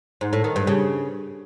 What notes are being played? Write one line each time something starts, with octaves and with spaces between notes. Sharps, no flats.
G#2
A2
D#3
G2
C#3